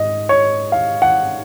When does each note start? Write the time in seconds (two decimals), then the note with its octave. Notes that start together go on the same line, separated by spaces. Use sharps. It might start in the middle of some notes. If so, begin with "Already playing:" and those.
Already playing: G#2 D#5
0.29 C#5
0.72 F5
1.02 F#5